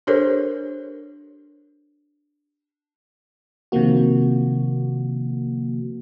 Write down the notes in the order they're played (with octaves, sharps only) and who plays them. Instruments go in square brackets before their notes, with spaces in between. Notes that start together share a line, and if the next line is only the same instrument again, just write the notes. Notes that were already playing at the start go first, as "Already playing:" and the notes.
[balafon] D4 G4 A4 A#4 C5 C#5
[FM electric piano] C3 D#3 F3 A#3 F#4